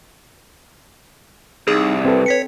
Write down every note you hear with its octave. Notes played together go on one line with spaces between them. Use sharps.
C2 D#4 G#4
C4 A4 B4
C#5 B6 C#7